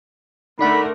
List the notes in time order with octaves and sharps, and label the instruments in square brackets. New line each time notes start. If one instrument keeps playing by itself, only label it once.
[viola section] D3 A3 A#4 [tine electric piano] D#4 D5 F#5 [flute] B5